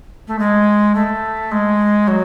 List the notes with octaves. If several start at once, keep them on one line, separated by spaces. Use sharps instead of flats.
A3
G#3
A3
G#3
F#3